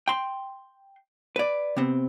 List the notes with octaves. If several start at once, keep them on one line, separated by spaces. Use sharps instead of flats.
G5 C6
B4 D5
C3 B3 C4